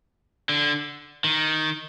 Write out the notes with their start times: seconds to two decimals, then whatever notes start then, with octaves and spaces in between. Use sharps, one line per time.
0.49 D3
1.24 D#3